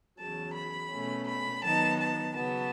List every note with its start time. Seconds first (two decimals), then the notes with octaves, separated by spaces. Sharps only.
0.19 E2 C#3 F#3 A5
0.55 B5
0.92 B2 A3 C#4
1.27 B5
1.63 D#3 F#3 B3 D#4 A5
2.00 A5
2.35 C#3 F#3 B3 A5